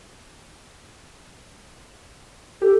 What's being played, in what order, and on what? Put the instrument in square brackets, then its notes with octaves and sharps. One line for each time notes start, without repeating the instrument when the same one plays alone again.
[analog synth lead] G4 [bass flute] A4